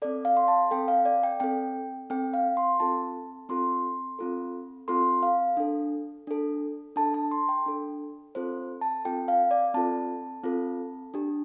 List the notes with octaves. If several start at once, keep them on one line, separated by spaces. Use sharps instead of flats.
C4 A4 D5
F5
C6
A5
C4 A4 G5
F5
D5
G5
C4 A4 G5
C4 A4 G5
F5
C6
C4 F4 A4 A5
C4 F4 A4 C6
C4 F4 A4
C4 F4 A4 C6
F5
D4 A4
D4 A4
D4 A4 A5
A5
C6
G5
D4 A4
C4 F4 A4 C5
A5
C4 F4 A4 G5
F5
D5
C4 F4 A4 A5
C4 F4 A4
D4 G4